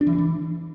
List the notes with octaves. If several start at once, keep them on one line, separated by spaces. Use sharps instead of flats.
D4
E3
D4
E3